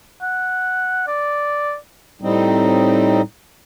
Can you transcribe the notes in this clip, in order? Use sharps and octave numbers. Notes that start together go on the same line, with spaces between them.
F#5
D5
A2 G3 C4 D#4